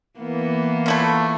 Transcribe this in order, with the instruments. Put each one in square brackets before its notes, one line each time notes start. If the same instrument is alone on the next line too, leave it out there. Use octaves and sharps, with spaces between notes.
[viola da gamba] E3 A#3 B3
[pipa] A3 E4 F4